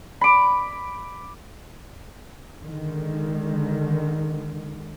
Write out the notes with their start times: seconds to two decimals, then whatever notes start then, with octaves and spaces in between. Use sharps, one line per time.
0.21 B5 D6
2.64 D3 D#3 G#3